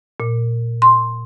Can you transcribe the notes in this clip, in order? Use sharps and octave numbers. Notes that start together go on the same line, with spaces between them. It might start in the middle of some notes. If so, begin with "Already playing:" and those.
A#2
C6